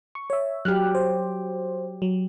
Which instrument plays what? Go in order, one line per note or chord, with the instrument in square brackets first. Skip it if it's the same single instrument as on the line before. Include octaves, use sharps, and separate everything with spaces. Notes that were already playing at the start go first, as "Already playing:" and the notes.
[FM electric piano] C#6
C#5 E5
[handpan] F#3 G4 [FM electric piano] F6 F#6
[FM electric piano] C5
F#3